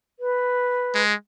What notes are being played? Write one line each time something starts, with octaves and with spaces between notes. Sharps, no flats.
B4
G#3